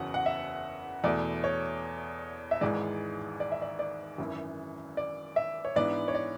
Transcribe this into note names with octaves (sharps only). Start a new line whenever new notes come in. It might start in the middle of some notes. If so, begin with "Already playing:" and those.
Already playing: F#1 E2 C#3 F#3 C#4 F#5
F#5
E5
E2 B2 A3 D5
C#5
E5
G#1 G#2 E3 G#3 D5
D5
E5
D5
D5
G#1 F#2 E3
D5
E5
C#5
G#2 E3 B3 D4 D5
C#5
D5